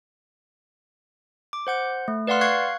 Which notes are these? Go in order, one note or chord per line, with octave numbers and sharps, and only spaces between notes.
D6
C5 F#5 G6
A3
B4 D5 F5 F#5 C6 F6
F5 C#6 F#6 G#6 C7